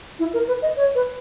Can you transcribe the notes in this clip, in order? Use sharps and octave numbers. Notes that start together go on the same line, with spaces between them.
E4
A#4
B4
D#5
C#5
B4